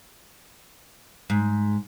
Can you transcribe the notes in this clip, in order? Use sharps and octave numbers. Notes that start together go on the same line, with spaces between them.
G#2